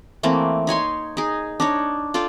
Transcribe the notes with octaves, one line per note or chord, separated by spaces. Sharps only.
E3 A3 A#3 C4
D#4 C#5 G#5 C6
D#4 G#4
D4 D#4 C#5
F4 A4 D5 G5